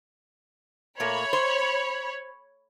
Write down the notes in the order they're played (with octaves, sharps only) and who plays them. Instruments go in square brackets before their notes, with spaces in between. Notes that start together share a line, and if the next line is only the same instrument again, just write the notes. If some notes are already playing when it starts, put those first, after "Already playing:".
[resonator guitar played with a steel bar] A#2 A3 A#3 [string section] C#5 B5
[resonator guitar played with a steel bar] C5